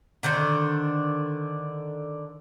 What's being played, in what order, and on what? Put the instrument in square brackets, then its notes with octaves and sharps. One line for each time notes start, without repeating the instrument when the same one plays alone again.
[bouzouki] D3 D#3 D4 C5